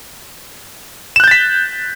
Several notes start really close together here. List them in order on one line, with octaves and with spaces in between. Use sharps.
E7 F#6 G6 A6 B6